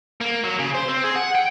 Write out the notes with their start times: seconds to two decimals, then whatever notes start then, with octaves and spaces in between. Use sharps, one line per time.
0.21 A#3
0.44 F#3
0.59 C#3
0.74 C5
0.89 C4
1.04 G#4
1.15 F#5
1.35 G5